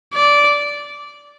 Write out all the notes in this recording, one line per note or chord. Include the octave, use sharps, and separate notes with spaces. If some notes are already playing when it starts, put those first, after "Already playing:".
D5